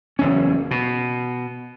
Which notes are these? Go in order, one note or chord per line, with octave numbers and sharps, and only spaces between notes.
F#1 E2 C#4
B2